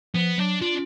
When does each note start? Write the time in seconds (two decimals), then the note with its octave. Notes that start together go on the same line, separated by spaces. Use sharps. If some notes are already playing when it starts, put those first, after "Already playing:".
0.14 F3 B3
0.38 F#3 D4
0.61 D4 F4